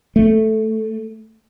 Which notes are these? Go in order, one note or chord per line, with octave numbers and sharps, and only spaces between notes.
A3